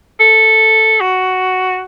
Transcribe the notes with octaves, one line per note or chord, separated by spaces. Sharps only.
A4
F#4